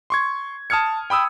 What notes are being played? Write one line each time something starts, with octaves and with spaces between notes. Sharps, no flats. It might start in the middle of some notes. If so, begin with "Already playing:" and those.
C6 C#6 G#6
A5 D#6 F6 G#6 C#7
G5 B5 D#6 E6